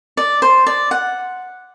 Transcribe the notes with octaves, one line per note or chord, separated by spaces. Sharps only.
D5
C5
D5
F#5